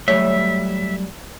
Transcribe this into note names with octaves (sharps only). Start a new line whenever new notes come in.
F#3 G3 A3 C#5 E5